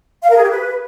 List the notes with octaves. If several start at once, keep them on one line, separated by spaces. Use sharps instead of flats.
F5
A#4
G#4
G4
B4